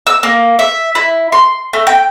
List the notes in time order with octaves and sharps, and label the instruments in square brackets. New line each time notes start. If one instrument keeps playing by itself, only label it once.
[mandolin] E6
A#3
E5
E4
C6
A3
G5